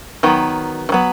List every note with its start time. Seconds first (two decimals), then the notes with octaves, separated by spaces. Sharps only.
0.23 D#3 F#3 B3
0.89 D#3
0.92 F#3 B3